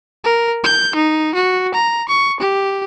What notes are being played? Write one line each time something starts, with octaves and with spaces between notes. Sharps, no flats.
A#4
G6
D#4
F#4
A#5
C#6
G4